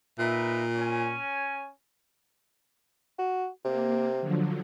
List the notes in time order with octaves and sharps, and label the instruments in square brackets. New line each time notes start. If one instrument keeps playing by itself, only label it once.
[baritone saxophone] A#2 [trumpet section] D#4 B4 E5
[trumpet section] C#4 G#5
[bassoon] F#4
[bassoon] C3 [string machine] A#3
[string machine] D3 F3 F#3